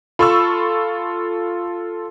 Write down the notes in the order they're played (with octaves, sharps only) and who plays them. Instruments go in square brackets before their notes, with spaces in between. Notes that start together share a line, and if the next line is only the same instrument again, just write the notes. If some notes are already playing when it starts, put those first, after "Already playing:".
[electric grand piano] F4 A4 [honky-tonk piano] B5 C#6 E6